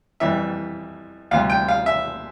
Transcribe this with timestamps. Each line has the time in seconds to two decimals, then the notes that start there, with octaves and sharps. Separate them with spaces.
0.20 F2 E3 G3 E5
1.31 D2 C3 G3 F5
1.50 G5
1.68 F5
1.86 E5